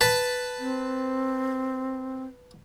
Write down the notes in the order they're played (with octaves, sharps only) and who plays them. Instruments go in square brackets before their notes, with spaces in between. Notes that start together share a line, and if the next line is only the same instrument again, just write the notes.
[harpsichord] B4 A5
[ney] C4